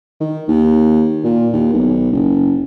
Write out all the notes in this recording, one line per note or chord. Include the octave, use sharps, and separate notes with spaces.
D#3
D#2
A#2
D#2
B1
F#1